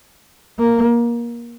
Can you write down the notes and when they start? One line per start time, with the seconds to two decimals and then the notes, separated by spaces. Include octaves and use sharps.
0.59 A#3